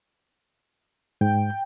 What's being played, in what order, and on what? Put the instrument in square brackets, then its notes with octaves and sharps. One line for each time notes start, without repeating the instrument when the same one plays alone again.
[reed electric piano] G#2 [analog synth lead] G5